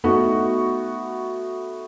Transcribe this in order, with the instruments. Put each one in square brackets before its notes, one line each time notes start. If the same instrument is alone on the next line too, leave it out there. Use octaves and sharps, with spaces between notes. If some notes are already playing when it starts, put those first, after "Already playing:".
[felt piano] A3 B3 D#4 F#4